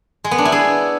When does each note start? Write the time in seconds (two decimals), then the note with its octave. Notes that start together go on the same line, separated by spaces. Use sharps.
0.24 G#3
0.31 B3
0.38 D4
0.45 E4
0.52 G#4